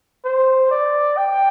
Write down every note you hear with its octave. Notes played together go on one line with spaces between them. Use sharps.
C5
D5
G5